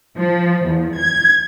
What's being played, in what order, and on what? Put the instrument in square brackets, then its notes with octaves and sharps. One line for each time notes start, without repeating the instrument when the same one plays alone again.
[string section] F3
E2
G#6